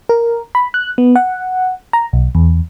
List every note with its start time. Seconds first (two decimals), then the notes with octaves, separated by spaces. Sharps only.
0.09 A#4
0.55 B5
0.74 F#6
0.98 B3
1.16 F#5
1.93 A#5
2.13 B1
2.35 E2